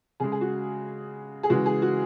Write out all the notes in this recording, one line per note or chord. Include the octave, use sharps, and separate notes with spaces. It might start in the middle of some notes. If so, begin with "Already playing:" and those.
C#3 G#3 G#4
G#4
F#4
G#4
C#3 E3 G#3 F#4
G#4
F#4